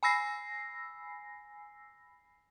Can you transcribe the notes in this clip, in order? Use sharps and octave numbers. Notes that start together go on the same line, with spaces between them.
G#5 B5 E6 A#6 C7